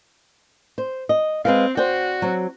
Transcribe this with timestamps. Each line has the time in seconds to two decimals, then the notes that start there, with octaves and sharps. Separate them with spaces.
0.78 C5
1.09 D#5
1.45 G#3 C4 B4 F5
1.77 F#4 C5 D5 G5
2.22 F#3 C4